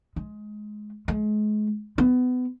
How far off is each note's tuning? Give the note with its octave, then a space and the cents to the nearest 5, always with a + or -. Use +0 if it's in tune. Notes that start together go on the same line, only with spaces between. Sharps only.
G#3 +20
G#3 +35
B3 +25